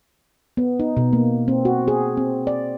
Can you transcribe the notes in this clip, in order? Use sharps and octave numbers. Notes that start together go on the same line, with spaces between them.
B3
D#4
B2
A#3
C4
F#4
G#4
C4
D5